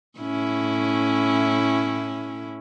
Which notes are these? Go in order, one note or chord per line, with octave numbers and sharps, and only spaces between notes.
A2 C#4 E4